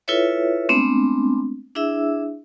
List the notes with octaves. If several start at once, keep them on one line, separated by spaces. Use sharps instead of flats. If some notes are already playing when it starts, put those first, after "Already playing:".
E4 F4 A4 B4 C#5 E5
G#3 A3 B3 C4 D4
D4 E4 G#4 E5 E6